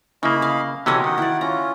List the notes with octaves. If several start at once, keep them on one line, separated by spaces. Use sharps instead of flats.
C#3 A#3 E4 D#5 B5
F5
C3 E3 C#4 F#4 G4 A4 D#5
D#3 F#5
E4 D5
C#4 F4 A#5